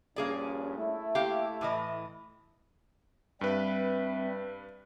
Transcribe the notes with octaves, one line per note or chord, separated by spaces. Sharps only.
A#1 G2 A#3 C#4 G#4 D5
A3 E4
A#3 G4 F5
A2 E3 D#5
G2 G3 C4 B4 E5